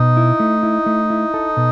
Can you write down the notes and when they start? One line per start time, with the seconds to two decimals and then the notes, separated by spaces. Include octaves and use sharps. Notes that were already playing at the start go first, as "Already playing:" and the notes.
Already playing: B2 D#4
0.17 E4
0.40 A3
0.63 E4
0.86 A3
1.10 E4
1.34 A4
1.57 B2